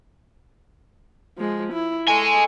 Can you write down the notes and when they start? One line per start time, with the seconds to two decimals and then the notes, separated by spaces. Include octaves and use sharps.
1.38 F3 G#3
1.73 E4
2.08 A4 D#5 G#5 C#6